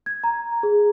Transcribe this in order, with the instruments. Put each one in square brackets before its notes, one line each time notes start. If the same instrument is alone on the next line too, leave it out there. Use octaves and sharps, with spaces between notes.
[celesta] G#6
A#5
G#4